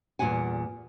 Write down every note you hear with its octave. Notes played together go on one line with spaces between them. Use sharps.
E2 A#2 F3 G3 F#5 G#5